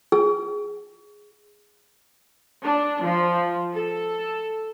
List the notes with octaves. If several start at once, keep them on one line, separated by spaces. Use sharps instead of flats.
G#4
D4
F3
A4